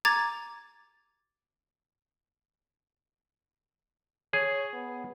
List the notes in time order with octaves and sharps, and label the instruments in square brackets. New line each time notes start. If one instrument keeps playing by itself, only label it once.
[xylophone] A#5 D6 G#6 A6
[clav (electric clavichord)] G#4 [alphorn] C#5
[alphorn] B3